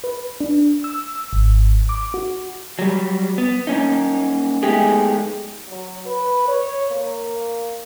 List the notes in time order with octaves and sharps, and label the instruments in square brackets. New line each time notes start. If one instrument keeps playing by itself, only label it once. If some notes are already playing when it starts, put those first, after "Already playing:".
[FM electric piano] B4
D4
E6
G#1
D6
F#4
[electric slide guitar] F#3 G3
B3
A#3 C#4 D#4
G#3 A3 B3 D#4 G4 G#4
[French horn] F#3
B4
C#5
A#3